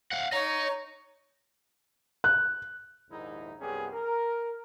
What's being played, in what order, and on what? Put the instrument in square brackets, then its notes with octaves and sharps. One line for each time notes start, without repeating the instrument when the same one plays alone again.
[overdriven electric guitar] F5 F#5
[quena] C#5 [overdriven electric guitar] D#5 A#5
[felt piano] F#6
[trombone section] A#1 D#2 G#2 D#4 E4
C2 F#2 B3 C#4 G4 G#4
A#4